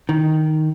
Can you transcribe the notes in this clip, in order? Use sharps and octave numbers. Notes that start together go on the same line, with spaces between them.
D#3